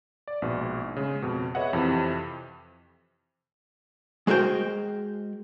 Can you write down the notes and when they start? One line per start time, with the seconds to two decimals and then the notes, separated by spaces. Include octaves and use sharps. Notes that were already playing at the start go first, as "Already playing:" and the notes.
0.28 D5
0.42 A#1 G#2 B2
0.96 C#3 G#3
1.22 F2 B2
1.55 G#4 B4 C#5 D#5 E5 F#5
1.73 F2 C3 E3
4.27 G#3 F#4 G#4 A#4 C5 G5